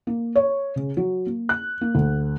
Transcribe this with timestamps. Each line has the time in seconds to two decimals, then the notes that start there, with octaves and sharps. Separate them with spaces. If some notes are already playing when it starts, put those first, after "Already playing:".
0.07 A#3
0.35 C#5
0.76 C#3
0.97 F#3
1.27 A#3
1.49 F#6
1.81 A#3
1.95 D2